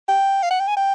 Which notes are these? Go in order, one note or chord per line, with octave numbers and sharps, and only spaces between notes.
G5
F5
F#5
G5
G#5
G5